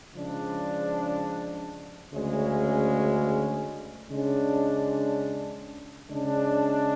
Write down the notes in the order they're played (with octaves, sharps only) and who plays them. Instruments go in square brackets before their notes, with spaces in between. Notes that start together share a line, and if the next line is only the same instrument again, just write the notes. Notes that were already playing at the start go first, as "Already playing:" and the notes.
[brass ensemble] C#3 F3 G#3 D4
D2 C#3 G#3 C#4
C#3 G#3 D4
C#3 G#3 D4